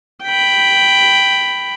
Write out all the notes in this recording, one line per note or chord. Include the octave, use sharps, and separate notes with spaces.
G5 B5